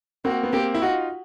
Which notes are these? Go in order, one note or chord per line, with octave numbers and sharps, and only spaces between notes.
A#3 C4 F#4
B3
A#3 C4 G4
E4
D#4 F4 F#4